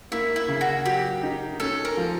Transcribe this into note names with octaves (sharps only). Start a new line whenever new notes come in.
A#3 E4
E4
C#3
F#4
F#3 G4
D#4
C#4 A4
A#4
F3